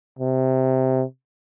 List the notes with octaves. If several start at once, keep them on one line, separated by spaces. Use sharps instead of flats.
C3